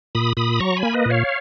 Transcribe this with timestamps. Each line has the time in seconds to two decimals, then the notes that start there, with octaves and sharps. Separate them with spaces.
0.15 A#2 B5 D#6
0.37 A#2 B5 D#6
0.59 F#3 A#5 C#6
0.77 G#5 B5
0.83 A#3
0.93 B4 D#5
1.06 A#2 C#5 F5